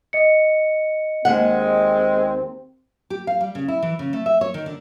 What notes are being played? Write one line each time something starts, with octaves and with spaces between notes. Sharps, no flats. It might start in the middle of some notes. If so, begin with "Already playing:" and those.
D#5 C#7
D#2 G#3 C4 F#5
G4
F5
G3
C#3
E4
E3
C#3
A3
E5
C#5
D#3
D3